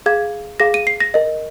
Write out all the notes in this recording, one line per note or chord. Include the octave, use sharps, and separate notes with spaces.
G#4 F5 G#6
G#4 F5 A#6
D#7
C7
A#6
A#4 D#5